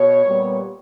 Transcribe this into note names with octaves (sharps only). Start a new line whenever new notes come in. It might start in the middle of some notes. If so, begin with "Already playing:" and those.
Already playing: B2 C#5
A#2 G3 B3